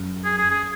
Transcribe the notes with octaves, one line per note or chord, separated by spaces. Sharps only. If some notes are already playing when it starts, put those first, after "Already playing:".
Already playing: F#2
G#4
G#4
G#4